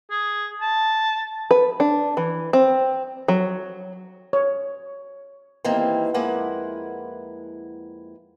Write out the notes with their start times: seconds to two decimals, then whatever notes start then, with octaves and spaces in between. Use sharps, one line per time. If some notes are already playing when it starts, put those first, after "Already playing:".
0.11 G#4
0.61 A5
1.51 B4
1.80 D4
2.17 E3
2.53 C4
3.28 F#3
4.33 C#5
5.64 D#3 E3 G3 A#3 C4
6.14 F2 G#3 A#3 E4 B4 F#5